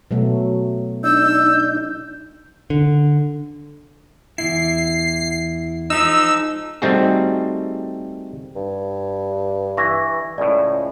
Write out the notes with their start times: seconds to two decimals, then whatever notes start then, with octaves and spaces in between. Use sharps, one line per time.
0.11 B2 F#3 A3
1.04 D4 D#4 E6 G6
2.70 D3
4.38 E2 G#2 E4 C7
5.90 F3 G#3 D#4 E6
6.82 G3 A3 C4 D#4 F#4 G#4
8.56 G2
9.77 E3 C#6 A#6
10.38 C#2 A2 D5